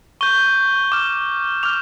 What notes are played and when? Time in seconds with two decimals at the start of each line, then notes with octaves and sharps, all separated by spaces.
0.21 C#6 G6 G7
0.92 D6 F6
1.63 D6 F6 F7